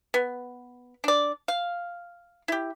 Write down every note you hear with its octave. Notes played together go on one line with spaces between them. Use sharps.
B3
D4 D5
F5
E4 G4